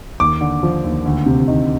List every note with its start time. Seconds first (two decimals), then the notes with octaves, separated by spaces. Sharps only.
0.20 D#2 D6
0.41 D3
0.63 F3
0.84 D#2
1.06 D2
1.26 C3
1.48 D#3